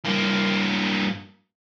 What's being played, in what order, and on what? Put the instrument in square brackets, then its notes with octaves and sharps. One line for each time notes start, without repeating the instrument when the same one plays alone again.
[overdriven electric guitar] G2 A#3